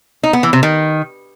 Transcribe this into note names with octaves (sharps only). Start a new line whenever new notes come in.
D#4
B3
E3
C3
D#3